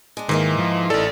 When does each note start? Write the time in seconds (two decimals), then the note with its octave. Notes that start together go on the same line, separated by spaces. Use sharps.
0.17 G#3 D4
0.29 G#2 D#3 E3 A#3 D#4
0.59 F3
0.90 A1 A4 D5